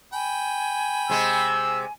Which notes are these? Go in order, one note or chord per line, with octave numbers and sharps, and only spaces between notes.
G5 G#5 B5
C3 G#3 E6